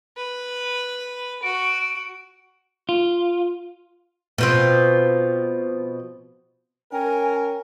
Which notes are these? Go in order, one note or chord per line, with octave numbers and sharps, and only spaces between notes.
B4
F#4 D7
F4
B2 F3 C4
C#4 A#4 G5 G#5